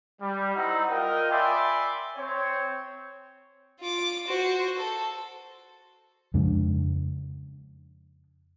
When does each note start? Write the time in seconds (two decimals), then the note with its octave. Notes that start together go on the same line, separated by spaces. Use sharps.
0.21 G3
0.55 C4 D#4 E4 F#5 A#5
0.90 F4 A#4 D#5 G5
1.30 D5 E5 G#5 B5 C6 D6
2.16 C4 C#5
3.80 F4 D6
4.27 F#4 C5
4.77 A4
6.34 F2 C#3 G#3 D4